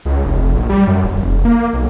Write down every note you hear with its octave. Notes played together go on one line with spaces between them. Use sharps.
C#2
F1
A#1
G3
F#2
D#1
F1
A#3
B1